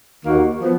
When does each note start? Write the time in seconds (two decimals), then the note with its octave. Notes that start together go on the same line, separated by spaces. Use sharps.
0.24 D#2 D#3 A#3 D#4 F#4
0.61 F3 B3